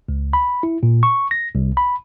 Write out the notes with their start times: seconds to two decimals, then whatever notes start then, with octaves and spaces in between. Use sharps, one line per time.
0.09 C#2
0.33 B5
0.63 E4
0.83 A#2
1.03 C#6
1.31 A#6
1.55 C2
1.77 B5